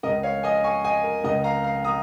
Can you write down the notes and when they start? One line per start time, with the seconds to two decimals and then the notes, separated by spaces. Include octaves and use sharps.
0.03 C#2 C#3 A#4 D#5
0.23 C#5 F5
0.43 D#5 G#5
0.64 G#5 C#6
0.85 D#5 G#5
1.04 A#4
1.24 C#2 C#3 A#4 D#5
1.44 F5 A#5
1.64 F5 A#5
1.84 A#5 D#6